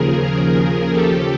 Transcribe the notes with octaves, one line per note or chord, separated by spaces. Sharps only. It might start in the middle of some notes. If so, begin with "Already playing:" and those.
Already playing: D#2 C#3 F3 G#4 A#4
G4 A4